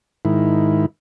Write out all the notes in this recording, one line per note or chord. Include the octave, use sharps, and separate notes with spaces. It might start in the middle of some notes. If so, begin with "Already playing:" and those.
G#2 D#3 E4